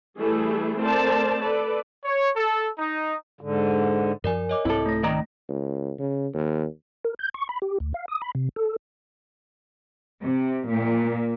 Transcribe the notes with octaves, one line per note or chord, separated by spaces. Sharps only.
E3 G3 A3 E4 G#4 A4
A3 C4 A#4 C5 D5 A5
A4 B4 D5
C#5
A4
D#4
G#2 D3
F#2 F3 A#4 D5 G#5
C#5 D#5 D6
C2 G#2 C4 E4 A4
A3 A#6
D#3 D5 A#5
C#2
C#3
D#2
A#4
G6
C#6
B5
G4
D2
F5
D#6
B5
C3
A4
C3
A#2